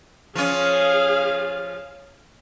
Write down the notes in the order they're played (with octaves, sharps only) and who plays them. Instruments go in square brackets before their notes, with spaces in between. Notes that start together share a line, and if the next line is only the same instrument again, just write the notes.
[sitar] F3 C#4 [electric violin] G#4 F5